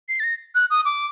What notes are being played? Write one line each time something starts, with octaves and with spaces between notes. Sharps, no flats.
C7
A6
A#6
F#6
D#6
D6